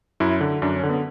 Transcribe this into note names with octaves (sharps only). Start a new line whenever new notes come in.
F#2 E4
D3
F#2 D4
C#4
D3
B3